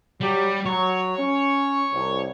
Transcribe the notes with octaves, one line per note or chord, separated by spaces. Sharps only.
F#3 G3 G4
F#3 C#5
C#4
C2